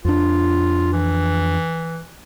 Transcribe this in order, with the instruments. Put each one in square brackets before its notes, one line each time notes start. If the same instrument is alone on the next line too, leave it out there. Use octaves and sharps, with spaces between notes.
[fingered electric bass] F2 D4 [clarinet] F4
[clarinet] E3